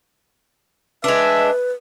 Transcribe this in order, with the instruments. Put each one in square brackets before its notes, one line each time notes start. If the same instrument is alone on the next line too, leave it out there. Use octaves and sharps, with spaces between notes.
[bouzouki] G#3 D4 [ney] B4 [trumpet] E5